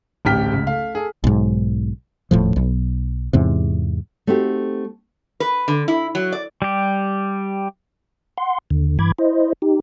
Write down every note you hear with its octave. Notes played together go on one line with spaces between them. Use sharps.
D1 A1 G4 G5 F6 B6
C#2
A3 F5
G#4 A4
B1 G#2
D#1 A2 F3
B1
E2 G#2 C3
A3 C4 D#4 F#4 G4
B4
D3
E4
F#3
D5
G3 G4
F#5 C6
D#2 D3
G2 E3 B5 D6 G#6
E4 C5 D#5
D#4 G4